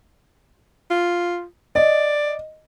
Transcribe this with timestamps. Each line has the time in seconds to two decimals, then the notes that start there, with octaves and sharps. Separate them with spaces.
0.90 F4
1.75 D5 D#5